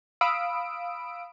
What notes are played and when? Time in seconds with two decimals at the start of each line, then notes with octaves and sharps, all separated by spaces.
0.21 F5 B5 D#6 E6 D7